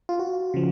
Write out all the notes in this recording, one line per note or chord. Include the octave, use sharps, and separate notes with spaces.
F4
F#4
C#3 F3